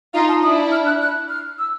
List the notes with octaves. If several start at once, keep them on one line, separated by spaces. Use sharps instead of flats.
D#4 F4 F5
A5
D4 E4 D#6
F6
F#6
F#6
F6
E6